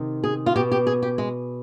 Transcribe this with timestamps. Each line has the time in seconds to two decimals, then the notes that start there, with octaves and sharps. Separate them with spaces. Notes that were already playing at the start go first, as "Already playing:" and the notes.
Already playing: C3 D#3
0.24 G#4
0.46 F4
0.56 B2 G4
0.72 G4
0.87 G#4
1.02 G4
1.18 G#3